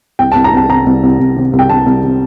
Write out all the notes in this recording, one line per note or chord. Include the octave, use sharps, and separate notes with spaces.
C2 G5
A5
C2
A#5
C2 A5
C3 A#5
C2
C2
C2
C3
C2
G5
C3 A5
C2
C3